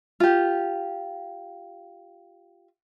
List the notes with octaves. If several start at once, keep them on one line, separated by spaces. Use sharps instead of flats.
F4 G4